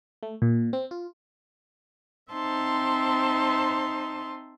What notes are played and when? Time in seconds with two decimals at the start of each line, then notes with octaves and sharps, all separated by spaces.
0.23 A3
0.42 A#2
0.73 C4
0.91 F4
2.31 C4 D#4 C5 E5 A5 C6